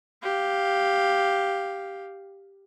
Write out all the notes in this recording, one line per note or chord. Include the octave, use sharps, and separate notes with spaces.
G4 F5